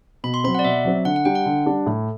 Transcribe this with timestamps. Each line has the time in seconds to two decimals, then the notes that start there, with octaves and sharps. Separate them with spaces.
0.24 B2 B5
0.34 C6
0.44 C4 B5
0.47 F#3
0.55 F#5
0.59 D5
0.64 B2 E5
0.85 F#3 C4
1.05 D3 F#5
1.16 F#5
1.25 G3 D4 G5
1.35 F#5
1.46 D3
1.66 G3 D4
1.86 A2